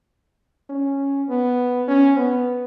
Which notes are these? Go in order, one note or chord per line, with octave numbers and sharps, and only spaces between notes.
C#4
B3
C#4
B3